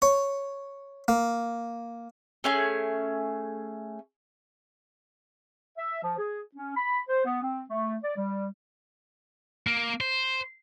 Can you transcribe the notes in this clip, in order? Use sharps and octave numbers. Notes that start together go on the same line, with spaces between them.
C#5
A#3
A3 C#4 G#4
E5
F3
G#4
C#4
B5
C5
B3
C4
A3
D5
G3
A#3
C5